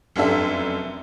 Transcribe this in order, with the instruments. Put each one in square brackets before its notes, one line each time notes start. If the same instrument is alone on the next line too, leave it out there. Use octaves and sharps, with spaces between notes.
[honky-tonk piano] F1 F#2 D4 A4 E5